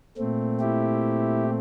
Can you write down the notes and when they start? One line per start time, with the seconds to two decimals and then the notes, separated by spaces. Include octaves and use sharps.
0.18 A#2 A3 C4
0.60 E4 G4